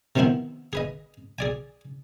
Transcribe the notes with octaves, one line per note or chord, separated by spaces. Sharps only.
C3 D#3 F3 B3 E4 C5
G#4 B4 D#5
G#4 D5 G#5